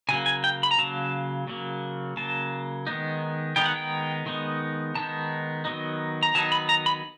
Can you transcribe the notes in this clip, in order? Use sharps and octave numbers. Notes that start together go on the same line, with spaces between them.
C#3 F#3 A#3 G#5
G#5
G5
B5
A#5
C#3 F#3 A#3 A5
C#3 F#3 A#3
C#3 F#3 A#3 A5
D#3 G#3 B3 D#4
D#3 G#3 B3 D#4 G5
F#5
G5
D#3 G#3 B3 D#4
D#3 G#3 B3 D#4 A5
D#3 F#3 B3 D#4
A#5
D#3 F#3 B3 D#4 A5
B5
A#5
B5